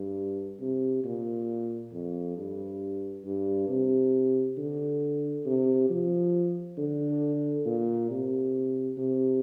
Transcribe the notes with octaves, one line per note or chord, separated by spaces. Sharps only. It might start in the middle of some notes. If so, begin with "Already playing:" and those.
Already playing: G2
C3
A#2
F2
G2
G2
C3
D3
C3
F3
D3
A#2
C3
C3